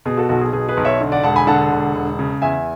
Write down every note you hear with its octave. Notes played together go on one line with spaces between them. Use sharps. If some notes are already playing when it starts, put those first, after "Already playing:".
B2 G#4
F#4 A4
B1 F#4 A4
G#4
B2 G#4
G#4 B4
B1
C#5 E5
D3
D5 F#5
E1 F#5 A5
G#5 B5
D3 F#5 A5
E1
E1
C#3
E2 E5 G#5